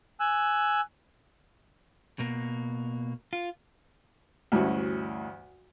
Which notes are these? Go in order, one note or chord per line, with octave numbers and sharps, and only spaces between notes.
G#5 E6 F#6
B2 A#3
F4
D2 G2 E3 C#4 F#4